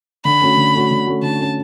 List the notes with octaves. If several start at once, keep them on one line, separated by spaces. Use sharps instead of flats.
D3 B5
A3 C#4 F#4
D3
A3 C#4 F#4
D3
A3 C#4 F#4
D3 A5
A3 C#4 F#4